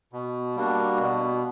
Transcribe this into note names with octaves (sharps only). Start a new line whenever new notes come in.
B2
G3 A#3 D4 F#4
B2